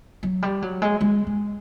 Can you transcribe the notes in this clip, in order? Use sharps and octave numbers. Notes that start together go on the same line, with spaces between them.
F#3
G3
F#3
G#3
G#3
G#3